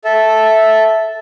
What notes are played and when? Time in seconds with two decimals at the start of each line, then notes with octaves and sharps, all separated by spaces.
0.05 A4 E5